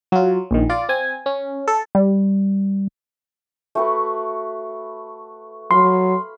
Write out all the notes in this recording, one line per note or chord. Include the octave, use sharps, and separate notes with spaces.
F#3 F4
A#1 D#3
F4 D5
C4 G#5
C#4
A4
G3
A3 F#4 B4
F#3 F5 B5 C6